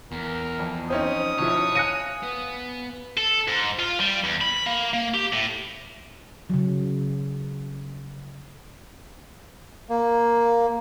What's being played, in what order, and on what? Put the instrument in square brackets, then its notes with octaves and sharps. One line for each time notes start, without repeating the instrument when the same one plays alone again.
[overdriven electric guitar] E2 [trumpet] A#4
[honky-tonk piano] F2
[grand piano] C4 C#4 D#4 [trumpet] D#6
[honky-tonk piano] B1 F3 E4 [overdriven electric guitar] C#5
[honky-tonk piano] F5 G#5 F#6 [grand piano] A#6 C#7 D#7
[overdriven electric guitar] B3
[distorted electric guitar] A4
G#2
F4
G3
E2
B5
A#3
A#3
G4
A2
[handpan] C#3 F#3
[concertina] A#3